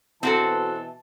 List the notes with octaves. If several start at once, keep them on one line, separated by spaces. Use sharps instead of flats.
B2 E3 C4 F#4 A4 A5